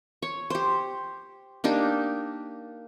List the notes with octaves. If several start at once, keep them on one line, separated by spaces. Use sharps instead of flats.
C#5
G4 C5
A#3 D4 D#4 G4